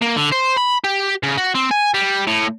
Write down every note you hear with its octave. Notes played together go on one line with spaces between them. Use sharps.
A#3
D3
C5
B5
G4
C#3
F#4
C4
G#5
G3
A2